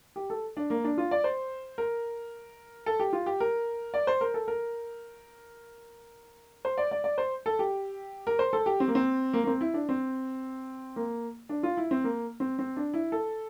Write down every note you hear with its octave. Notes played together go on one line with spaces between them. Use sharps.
G4
A4
D4
A#3
D4
F4
D5
C5
A#4
A4
G4
F4
G4
A#4
D5
C5
A#4
A4
A#4
C5
D5
D5
D5
C5
A4
G4
A#4
C5
A4
G4
C4
A#3
C4
A#3
A#3
C4
E4
D4
C4
A#3
D4
F4
E4
C4
A#3
C4
C4
D4
E4
A4